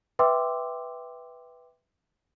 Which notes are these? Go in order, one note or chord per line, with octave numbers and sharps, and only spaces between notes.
B4 E5 G5 C6 D6 E6